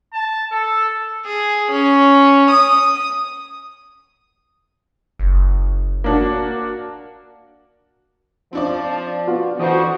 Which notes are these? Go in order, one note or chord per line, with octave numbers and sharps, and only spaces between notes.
A5
A4
G#4
C#4
D#6
F#1
A#3 D4 F#4
F3 C4 D4 D5
B3 F4 F#4
F2 E3 F#4 C5 D#6